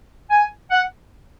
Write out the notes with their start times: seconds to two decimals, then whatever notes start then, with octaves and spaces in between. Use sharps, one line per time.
0.31 G#5
0.71 F#5